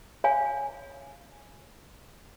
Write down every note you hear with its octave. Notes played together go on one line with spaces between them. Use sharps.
C#5 F5 G#5